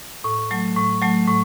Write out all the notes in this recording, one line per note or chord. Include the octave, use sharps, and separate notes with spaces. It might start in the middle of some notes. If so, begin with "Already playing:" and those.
A2
F#3 A3
A2
F#3 A3
A2